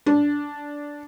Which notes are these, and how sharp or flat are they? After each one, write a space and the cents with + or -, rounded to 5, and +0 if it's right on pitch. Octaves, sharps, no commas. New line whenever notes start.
D4 -10